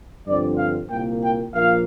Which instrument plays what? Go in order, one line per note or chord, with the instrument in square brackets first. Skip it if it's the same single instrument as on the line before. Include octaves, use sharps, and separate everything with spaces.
[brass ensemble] G2 D3 F3 C4 D5
F5
C2 A#2 A#3 G5
G5
A#1 A#2 F3 A#3 F5